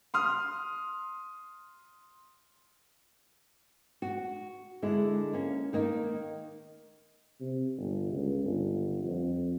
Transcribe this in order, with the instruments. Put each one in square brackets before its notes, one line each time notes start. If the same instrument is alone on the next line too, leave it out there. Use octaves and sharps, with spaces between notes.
[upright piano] C6 D#6 F6
[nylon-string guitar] F#4
D3 G#3 E4
A#3 C#4
D#3 A#3 D#4
[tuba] C3
G1
C#2
G1
F2